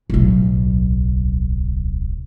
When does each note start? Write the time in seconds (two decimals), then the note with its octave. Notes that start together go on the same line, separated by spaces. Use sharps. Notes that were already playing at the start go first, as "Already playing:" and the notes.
0.10 D1 B1